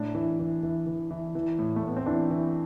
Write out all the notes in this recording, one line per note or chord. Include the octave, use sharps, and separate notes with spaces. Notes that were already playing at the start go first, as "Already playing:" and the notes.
Already playing: A2 D4
E3
E3
E3
E3
E3
E3
A2
A3
A2 B3
C4
E3 D4
E3